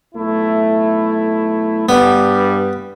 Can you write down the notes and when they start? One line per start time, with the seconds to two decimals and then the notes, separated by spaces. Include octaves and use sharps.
0.15 B1 A3 E4
1.89 G2 G3 B3